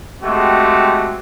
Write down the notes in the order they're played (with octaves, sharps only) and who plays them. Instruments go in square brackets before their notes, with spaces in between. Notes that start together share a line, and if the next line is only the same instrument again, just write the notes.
[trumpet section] G#3 A3 C4 F#4 G4